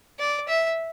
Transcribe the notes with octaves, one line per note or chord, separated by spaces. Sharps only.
D5
E5